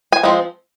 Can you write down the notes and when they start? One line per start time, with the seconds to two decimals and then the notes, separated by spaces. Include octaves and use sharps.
0.12 G#5
0.23 F3 G#3 C4